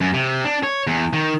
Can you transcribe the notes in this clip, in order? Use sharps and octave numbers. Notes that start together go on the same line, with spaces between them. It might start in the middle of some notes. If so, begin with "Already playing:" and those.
F#2
C3
D4
C#5
E2
D#3